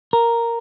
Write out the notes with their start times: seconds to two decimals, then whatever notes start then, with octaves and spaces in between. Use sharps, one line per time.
0.13 A#4